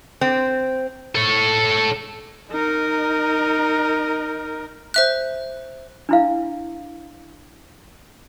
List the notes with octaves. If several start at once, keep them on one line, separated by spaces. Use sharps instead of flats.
C4
A4 C#5
D#4 A#4
C5 E5 F#6
D4 E4 F5